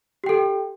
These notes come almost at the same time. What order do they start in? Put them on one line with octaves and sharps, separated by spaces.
G4 G5 A4